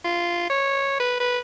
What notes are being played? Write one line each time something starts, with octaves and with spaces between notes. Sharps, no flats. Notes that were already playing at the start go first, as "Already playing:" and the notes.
F4
C#5
B4
B4